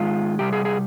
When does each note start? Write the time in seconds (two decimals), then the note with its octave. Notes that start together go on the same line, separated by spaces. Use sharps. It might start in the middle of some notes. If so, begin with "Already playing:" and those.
Already playing: G#2 D#3 G#3 F4
0.39 C3 G3 G4
0.53 G#4
0.65 G#4